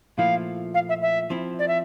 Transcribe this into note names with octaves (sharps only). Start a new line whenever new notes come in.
A#2 F3 A3 E4 F5
F5
E5
E5
F3 C4 E4
D5
E5